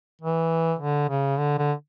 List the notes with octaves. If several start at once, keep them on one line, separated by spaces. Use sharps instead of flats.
E3
D3
C#3
D3
D3